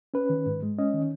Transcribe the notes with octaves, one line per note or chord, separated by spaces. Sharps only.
C#4 B4
D#3
G#2
G#3
C#4 D#5
D#3